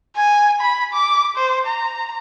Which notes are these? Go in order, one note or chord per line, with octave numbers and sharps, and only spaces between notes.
G#5
B5
D6
C5
A#5